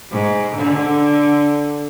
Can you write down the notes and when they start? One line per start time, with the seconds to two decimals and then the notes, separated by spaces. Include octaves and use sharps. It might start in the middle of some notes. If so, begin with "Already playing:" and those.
0.12 G#2
0.55 D3